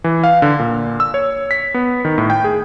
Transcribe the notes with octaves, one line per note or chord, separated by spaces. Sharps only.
E3
F5
D3
A#2
E6
C#5
B6
B3
D#3
A2
G5
G#4